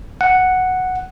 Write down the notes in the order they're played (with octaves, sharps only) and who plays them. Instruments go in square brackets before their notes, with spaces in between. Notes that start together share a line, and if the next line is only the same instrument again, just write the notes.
[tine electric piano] F#5